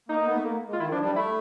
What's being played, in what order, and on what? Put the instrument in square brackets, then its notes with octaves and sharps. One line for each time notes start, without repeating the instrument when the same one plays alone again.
[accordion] A#3 [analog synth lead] D#4
[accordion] A#3
B3
A3
A#3
G#3
[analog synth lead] F4
[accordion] D#3 [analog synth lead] E4
[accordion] F3 [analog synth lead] D4
[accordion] G3 [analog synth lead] D4
[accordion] A3 [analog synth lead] E4